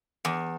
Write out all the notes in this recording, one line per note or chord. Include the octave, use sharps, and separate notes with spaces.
E2